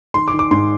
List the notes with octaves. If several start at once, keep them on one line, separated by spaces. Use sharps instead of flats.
D#3 C6
D6
D#3
D6
G#2 C6